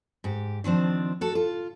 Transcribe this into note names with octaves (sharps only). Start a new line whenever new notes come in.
G#2 G4
D#3 F3 C4 D4
F#4 A4
F4